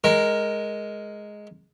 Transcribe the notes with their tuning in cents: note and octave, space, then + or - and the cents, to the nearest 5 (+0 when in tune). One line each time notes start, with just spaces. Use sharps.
G#3 +5 A#4 +0